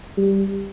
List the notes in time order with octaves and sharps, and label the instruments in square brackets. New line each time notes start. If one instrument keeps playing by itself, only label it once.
[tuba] G3